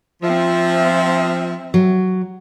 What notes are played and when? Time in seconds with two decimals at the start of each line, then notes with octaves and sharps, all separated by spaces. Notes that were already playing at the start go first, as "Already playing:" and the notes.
0.22 F3 C4 E5
1.74 F#3